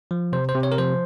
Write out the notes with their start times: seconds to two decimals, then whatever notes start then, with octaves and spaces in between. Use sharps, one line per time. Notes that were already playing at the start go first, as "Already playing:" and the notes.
0.11 F3
0.33 C3 C5
0.49 C5
0.55 C3
0.63 C#5
0.72 A#4
0.78 F3 C5